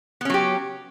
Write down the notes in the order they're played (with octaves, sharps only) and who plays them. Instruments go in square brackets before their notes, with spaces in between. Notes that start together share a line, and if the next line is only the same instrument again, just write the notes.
[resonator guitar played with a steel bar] B3
C#4
F#3
G4